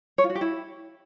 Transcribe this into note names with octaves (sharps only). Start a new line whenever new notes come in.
C#5
F4
F#4
G4
E4